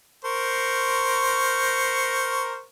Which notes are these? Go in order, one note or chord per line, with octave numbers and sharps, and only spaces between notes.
A#4 C5 C#6